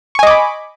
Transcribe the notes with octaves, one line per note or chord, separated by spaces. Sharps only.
D#5 G#5 B5 C#6 D6